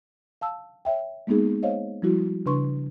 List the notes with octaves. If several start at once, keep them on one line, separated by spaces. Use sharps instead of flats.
F5 A5 E6
C#5 E5 G5
G#3 A#3 B3 D#4 G#4
C5 C#5 D#5 F5
F3 G3 E4 F#4
C#3 D4 B4 C6 C#6